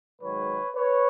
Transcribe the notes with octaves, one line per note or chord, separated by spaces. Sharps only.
G#2 D#3 F#3 B4 C#5
B4 C#5